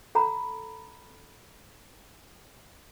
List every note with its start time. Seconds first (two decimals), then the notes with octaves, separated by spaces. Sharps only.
0.15 A4 F#5 A#5 B5